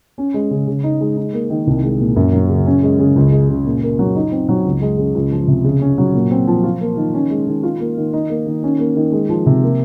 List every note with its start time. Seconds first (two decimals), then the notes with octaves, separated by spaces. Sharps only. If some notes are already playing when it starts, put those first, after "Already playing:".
0.18 C#4
0.34 G#3
0.51 C#3
0.67 C#3
0.84 D#4
1.01 G#3
1.17 D#4
1.33 A#3
1.50 D#3
1.67 C2
1.84 G#3
2.00 A#2
2.16 F#2
2.33 F#3
2.49 C#3
2.66 C#4
2.83 G#3
2.99 C#3
3.16 C#2
3.32 G#3
3.49 C#3
3.66 A#2
3.82 A#3
3.99 F#3
4.16 D#4
4.32 C4
4.49 F#3
4.65 C#2
4.82 G#3
4.98 C#3
5.15 C#2
5.32 F3
5.47 C3
5.64 C#3
5.81 C#4
5.98 F#3
6.14 A#2
6.31 C4
6.47 F3
6.64 F4
6.81 A#3
6.97 D#3
7.14 C#4
7.30 G#3
7.47 D#3
7.63 F4
7.80 A#3
7.97 D#3
8.13 D#4
8.30 A#3
8.47 D#3
8.63 C#4
8.79 A#3
8.96 D#3
9.12 G#3
9.29 F3
9.46 C3
9.63 A#3